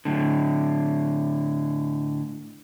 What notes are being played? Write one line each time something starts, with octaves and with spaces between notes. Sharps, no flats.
A2 D3